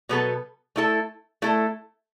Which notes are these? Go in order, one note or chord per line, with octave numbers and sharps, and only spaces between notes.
B2 F#3 B3 A4
A3 E4 A4
A3 E4 A4